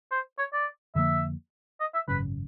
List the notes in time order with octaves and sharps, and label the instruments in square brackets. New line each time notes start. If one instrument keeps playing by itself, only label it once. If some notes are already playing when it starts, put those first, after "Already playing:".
[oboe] C5
C#5
D5
[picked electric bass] F2 D3 F3 A#3 [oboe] E5
[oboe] D#5
E5
[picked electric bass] G#1 F#2 C#3 [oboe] B4